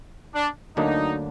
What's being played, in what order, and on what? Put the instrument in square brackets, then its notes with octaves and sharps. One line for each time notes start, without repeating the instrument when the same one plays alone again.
[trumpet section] D4
[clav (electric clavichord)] D2 D3 F#3 A#3 D4 [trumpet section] D#4